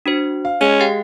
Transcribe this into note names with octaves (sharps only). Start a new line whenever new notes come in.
D4 F#4 C5
F5
G#3 C#4 G#6
G4 F5 G5